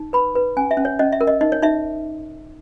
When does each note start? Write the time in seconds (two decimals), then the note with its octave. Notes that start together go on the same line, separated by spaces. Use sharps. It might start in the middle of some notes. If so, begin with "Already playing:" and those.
Already playing: D#4
0.13 B4 B5
0.35 B4
0.57 C#4 G#5
0.71 E5
0.77 C#4
0.85 C#5
0.99 C#4 D#5
1.12 E5
1.21 A#4
1.27 D#5
1.41 D#4 D#5
1.52 C#5
1.62 D#4 E5